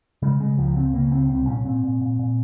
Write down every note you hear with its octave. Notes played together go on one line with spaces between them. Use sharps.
C#3 G#3
C#3 G#3
C#2 F3
C#2 C4
C#3 A#3
C#2 C4
C2 C4
A#2 C#4
A#2 C4
A#2
A#2
A#2